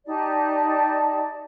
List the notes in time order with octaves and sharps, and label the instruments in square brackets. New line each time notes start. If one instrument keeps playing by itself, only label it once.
[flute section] D#4 G4 D5 A5